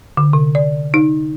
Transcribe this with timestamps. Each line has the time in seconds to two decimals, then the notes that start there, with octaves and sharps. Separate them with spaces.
0.17 D3
0.33 C3
0.55 D5
0.94 D#4